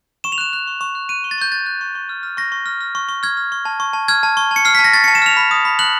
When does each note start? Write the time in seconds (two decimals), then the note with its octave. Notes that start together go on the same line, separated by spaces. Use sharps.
0.24 C#6 E7
0.32 F7
0.38 F#6 E7
0.53 F#6
0.67 C#6
0.81 C#6
0.95 F#6
1.09 F#6 D#7
1.24 C#6
1.31 A6
1.38 C#6 G6
1.52 F#6 A6
1.66 F#6
1.81 C#6
1.95 C#6
2.09 F6
2.23 F6
2.37 C#6 A#6
2.52 C#6
2.66 F6
2.81 F6
2.95 C#6
3.09 C#6
3.23 F6 G#6
3.37 F6
3.52 C#6
3.65 A5
3.80 C#6
3.93 A5
4.08 F6 G#6
4.23 A5
4.37 C#6
4.51 A5 C#7
4.65 F6 C7
4.75 A5 B6
4.84 A#6
4.93 C#6 A6
5.04 A5 C#7
5.15 E7
5.22 F6 F7
5.37 B5
5.51 D#6
5.65 B5
5.79 F#6 F#7